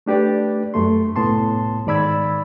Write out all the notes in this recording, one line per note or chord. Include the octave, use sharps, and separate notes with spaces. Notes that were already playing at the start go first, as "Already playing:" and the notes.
A3 D4 G4 B4 D5
F#2 A3 C6
C2 A2 B3 A5 C6
G#2 D#3 D5 B5 E6 G#6